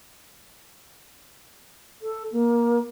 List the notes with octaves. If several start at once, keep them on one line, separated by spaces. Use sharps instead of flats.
A4
A#3